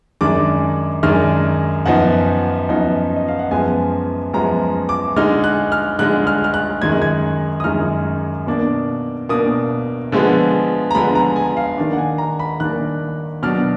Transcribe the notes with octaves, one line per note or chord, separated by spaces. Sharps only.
F#2 D#3 G#3 D4 D6
F#2 D#3 G#3 D4 F6
F#2 F3 B3 D#4 F#5
F#2 F3 B3 D#4
D#5
F5
F#5
F#2 F3 G#3 B3 G#5
F#2 F3 G#3 B3 A#5
D6
D3 G#3 D#4 F6
F#6
F6
D3 G#3 D#4 F#6
F6
F6
F#6
F#2 D#3 G#3 D#4 G#6
F#6
G#6
D#6
F#2 D#3 G#3 D#4 F6
B2 A#3 D4
B2 A#3 D4 D#6
D3 F3 G#3 B3
A#5
D3 F3 G#3 B3 B5
A#5
G#5
F5
D#3 A#3 D4
F#5
G#5
A#5
B5
D#3 A#3 D4 F#6
B2 F#3 D4 F6